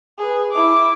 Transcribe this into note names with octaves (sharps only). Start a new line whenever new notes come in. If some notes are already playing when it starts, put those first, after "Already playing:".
G#4 B4
E4 D6